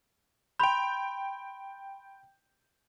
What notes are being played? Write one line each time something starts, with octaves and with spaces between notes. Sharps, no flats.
G5 B5 C6 G6 F7